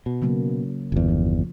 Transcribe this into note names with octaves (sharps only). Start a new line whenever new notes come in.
B2
C#3 F#3 A#3
G1 E2
F3